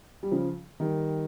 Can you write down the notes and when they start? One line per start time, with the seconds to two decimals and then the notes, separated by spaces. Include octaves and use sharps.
0.23 G3
0.31 C#3 F3
0.80 D#3 G3